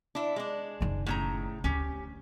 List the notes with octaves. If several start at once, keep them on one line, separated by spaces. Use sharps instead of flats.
D4 E4
G#3 D4
F#1 D#3
A2 C#3 A#5
D2 C#4 G4